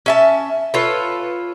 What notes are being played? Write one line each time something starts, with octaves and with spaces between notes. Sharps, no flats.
C#4 E5 A5
F4 A4 B4 C#5